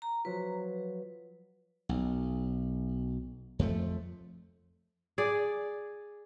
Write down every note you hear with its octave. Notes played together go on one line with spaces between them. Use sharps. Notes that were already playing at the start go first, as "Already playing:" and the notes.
A#5
F3 F#3 F4 B4
B1
F2 F3 A3
G#4 D5